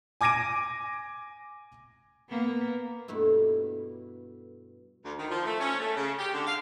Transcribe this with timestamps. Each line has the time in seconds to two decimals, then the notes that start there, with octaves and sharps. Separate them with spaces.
0.21 G#5 D6 G#6 A#6 D7 D#7
2.29 A#3 B3
3.08 G2 B2 A3 E4
5.05 D2
5.18 D#3
5.30 F3
5.45 A3
5.60 C#4
5.80 A3
5.96 C#3
6.18 G4
6.33 D3
6.47 F5